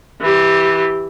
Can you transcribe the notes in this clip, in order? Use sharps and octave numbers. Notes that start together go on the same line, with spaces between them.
E3 G4